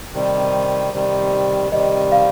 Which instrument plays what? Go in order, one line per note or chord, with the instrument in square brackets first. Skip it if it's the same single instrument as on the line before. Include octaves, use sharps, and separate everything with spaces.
[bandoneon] C3 D#3 G3
C3 D#3 G3
[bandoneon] C3 D#3 G3 [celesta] D#5
[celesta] F5